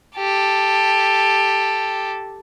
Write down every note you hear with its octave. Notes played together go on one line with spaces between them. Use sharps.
G4 A4